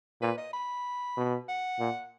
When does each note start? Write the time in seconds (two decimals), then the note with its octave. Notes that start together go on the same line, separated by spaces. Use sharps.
0.22 A#2 B4
0.38 D#5
0.53 B5
1.17 B2
1.49 F#5
1.80 A#2